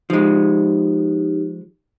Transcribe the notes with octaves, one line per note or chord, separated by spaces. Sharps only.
F3 G#3 D#4 G4